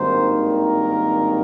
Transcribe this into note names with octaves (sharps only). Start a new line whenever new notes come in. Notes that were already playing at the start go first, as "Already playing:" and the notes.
Already playing: G#1 G2 D#3 A#3 C5
A#4